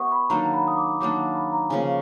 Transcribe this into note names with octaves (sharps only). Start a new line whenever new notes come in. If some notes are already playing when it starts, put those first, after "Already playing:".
Already playing: B3 E4 G4 C#6 D#6
B5
D#3 F#3 A#3 D4 A#5
B5
D#6
D6
D#3 F#3 A#3 D4 D6
B5
A#5
C#3 F3 A#3 C#4 G#5